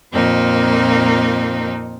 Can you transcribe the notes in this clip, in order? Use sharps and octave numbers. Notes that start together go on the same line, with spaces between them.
F2 A#2 A#3 C4 D#4